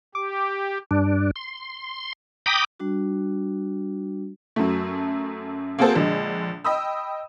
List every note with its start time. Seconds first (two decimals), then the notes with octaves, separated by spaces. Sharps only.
0.15 G4 D6
0.91 G2 D4
1.36 C6
2.46 G5 A#5 B5 D6 D#6
2.80 G3 D4 F#4
4.56 F#2 F#3 A3
5.78 A#3 C4 F#4 G#4 A4 C5
5.95 A#1 D3 G#3
6.64 D#5 G5 B5 D#6 E6